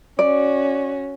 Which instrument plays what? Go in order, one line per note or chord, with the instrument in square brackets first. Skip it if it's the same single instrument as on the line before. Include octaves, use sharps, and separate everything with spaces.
[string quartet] C#4 F#4 [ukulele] D5